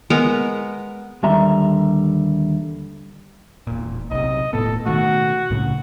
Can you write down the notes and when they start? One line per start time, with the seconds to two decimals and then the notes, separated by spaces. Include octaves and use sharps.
0.10 G#3 B3 A#4
1.23 D#2 D3 G3 E5 A#5 C6
3.67 E1 A#2
4.11 B1 C3 D#5
4.53 D#1 A2 B3 A4
4.86 B2 D#3 A3 F#4
5.50 C2 A2 C#3